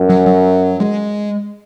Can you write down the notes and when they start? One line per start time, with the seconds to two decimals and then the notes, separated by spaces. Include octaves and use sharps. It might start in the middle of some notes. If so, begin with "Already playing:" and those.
Already playing: F#2
0.09 F#3
0.26 F#3
0.80 G#3